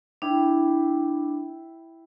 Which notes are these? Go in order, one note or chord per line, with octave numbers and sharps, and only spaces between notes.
D4 E4 G5